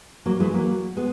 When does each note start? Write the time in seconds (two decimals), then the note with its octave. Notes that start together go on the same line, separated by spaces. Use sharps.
0.26 F#3 A#3
0.40 E3 G#3
0.54 F#3 A#3
0.97 G#3 B3